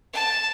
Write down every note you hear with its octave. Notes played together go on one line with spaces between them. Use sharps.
A5